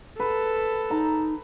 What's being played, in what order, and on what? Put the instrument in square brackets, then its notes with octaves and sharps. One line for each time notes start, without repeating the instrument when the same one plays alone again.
[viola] A4 [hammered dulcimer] B4
[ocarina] D#4 [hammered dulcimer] A#5